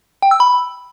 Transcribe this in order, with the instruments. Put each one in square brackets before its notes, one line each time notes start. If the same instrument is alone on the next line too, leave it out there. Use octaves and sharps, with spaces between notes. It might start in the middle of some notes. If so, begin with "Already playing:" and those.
[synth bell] G5
E6
B5